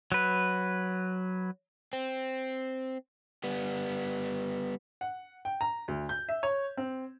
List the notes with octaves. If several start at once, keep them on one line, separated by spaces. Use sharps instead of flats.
F#3 B4
C4
G3 B3
F#5
G5
A#5
D2
G6
E5
C#5
C4